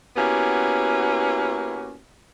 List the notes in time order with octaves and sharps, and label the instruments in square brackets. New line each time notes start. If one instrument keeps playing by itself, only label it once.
[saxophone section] A#3 B3 C#4 E4 F#4 G4